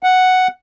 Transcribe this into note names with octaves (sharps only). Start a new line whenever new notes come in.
F#5